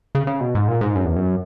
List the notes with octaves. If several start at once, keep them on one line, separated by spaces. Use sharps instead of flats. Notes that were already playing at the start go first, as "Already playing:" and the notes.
C#3
C#3
B2
G#2
A#2
G#2
F#2
E2
F#2